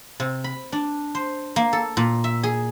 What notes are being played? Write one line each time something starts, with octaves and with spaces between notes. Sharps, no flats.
C3
B5
D4
C5
A#3
A4
A#2
E5
G#4